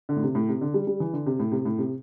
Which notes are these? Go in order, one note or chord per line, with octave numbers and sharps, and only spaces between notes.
D3
A2
C3
A2
C3
D3
G3
G3
E3
D3
C3
A2
C3
A2
C3